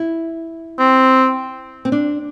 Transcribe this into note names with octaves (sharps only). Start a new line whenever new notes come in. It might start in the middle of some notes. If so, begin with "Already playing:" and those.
Already playing: E4
C4
C4
D4